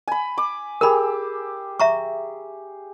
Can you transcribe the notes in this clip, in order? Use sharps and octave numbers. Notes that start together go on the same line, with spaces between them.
G#5 B5
D6
G4 G#4 A#4 B5 E6
E5 A#5 C#6